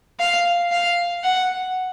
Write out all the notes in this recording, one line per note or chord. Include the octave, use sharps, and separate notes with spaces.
F5
F5
F#5